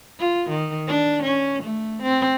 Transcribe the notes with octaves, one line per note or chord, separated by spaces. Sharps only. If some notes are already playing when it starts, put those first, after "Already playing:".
F4
D#3
D4
C#4
A3
C4